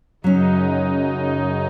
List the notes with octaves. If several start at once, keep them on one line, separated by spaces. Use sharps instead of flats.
F#2 C#3 F#3 C#4 D#4